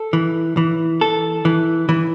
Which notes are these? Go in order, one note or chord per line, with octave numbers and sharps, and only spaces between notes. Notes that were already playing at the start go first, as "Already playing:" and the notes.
Already playing: A4
E3
E3
A4
E3
E3